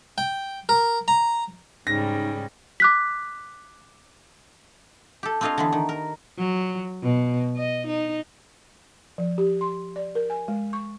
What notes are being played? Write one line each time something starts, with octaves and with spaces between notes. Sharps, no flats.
G5
A#4
A#5
G#2 C#3 G3 D#4 A#6
D6 F#6 B6
G4 A4
C4 D4 F4 C#5 D#5 F5
D3 E3 B3
D#3
A#4
F#3
B2
D#5
D#4
F3
G4
C6
D5
A#4
G#5
G#3
C#6